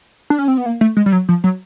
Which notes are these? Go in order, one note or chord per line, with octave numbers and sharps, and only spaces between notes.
D4
C#4
C4
B3
A#3
A3
G#3
G3
F#3
F3
F#3